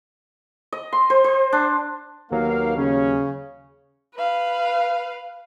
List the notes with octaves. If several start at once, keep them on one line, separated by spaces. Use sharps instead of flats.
D#5
C6
C5
C5
D4
D#2 F#3 A#3 B3 D#4 F5
C#3 C#4
B4 F5